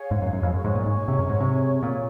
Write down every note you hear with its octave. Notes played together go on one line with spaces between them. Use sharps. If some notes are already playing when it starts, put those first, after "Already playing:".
Already playing: G#4 C#5 F5 G#5
G#2
F#2
F#2
F2
F#2 G#4 C#5 G#5 C#6
G#2
A#2
G#2
C3
F#2
G#2
C3
A#2